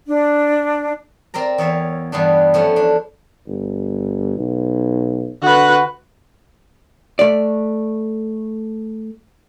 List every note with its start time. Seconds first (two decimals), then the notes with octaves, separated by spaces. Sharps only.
0.08 D4
1.34 C4 A#4 D5 A#5
1.58 E2 C#5 E5 F5
2.12 E2 G2 G3 B3 D4
2.54 F3 A3 C#4 E4
2.76 D4
3.47 G1
4.38 B1
5.42 D3 F#4 B4
7.19 A3 D5